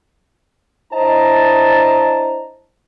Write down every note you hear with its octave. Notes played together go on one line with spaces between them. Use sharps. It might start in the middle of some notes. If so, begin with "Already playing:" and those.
D4 E4 C5 D#5 A5 A#5